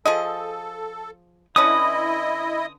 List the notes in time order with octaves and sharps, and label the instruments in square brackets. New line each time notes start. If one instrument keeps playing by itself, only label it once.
[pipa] F3 G#4 D#5 [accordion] A4
[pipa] D3 C#4 B4 [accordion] E4 D#5 [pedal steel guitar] D#6